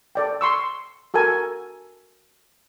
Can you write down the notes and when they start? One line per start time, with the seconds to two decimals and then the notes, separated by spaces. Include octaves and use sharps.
0.15 A4 D5 G5
0.41 C6 C#6 E6
1.14 F#4 A4 A#4 G#5